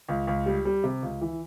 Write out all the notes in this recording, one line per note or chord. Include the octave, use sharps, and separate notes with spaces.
C#2
C#2
G3
G3
C3
C#2
E3